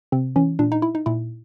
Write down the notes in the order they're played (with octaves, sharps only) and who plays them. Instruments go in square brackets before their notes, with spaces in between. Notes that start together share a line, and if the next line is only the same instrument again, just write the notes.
[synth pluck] C3 C4
E3 C#4
A#2 D4
D#4
E4
D#4
A#2 E4